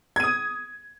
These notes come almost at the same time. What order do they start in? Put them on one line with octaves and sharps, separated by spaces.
G#6 D#7 D#6